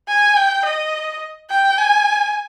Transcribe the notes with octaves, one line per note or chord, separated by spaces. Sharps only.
G#5
G5
D#5
G5
G#5